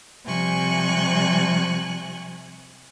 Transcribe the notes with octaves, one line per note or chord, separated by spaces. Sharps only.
C3 F3 G3 G#5 C#6 F#6